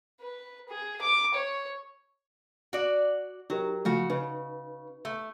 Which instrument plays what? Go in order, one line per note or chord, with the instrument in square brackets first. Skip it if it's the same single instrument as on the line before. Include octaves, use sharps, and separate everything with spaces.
[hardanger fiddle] B4
G#4
D6
C#5
[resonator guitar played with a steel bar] F#4 D5
[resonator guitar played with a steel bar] F#3 [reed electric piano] D#4 G4 A#4
[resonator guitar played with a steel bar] C#3 F#4 [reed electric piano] F3 A3
[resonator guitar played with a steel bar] C#3 [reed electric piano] D#4 B4
[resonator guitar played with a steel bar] A3